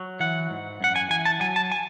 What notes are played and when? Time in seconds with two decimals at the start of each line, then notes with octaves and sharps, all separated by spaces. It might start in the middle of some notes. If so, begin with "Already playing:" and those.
Already playing: F#3
0.20 E3 F#5
0.50 G#2
0.81 F#2 F#5
0.96 G#5
1.10 E3 G#5
1.25 A5
1.41 F#3 G#5
1.56 A5
1.72 G#5